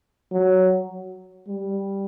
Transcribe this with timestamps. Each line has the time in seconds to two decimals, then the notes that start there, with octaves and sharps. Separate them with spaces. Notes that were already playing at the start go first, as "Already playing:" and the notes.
0.32 F#3
1.48 G3